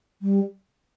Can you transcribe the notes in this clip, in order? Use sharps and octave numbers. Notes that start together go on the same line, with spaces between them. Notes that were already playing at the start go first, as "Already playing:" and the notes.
G3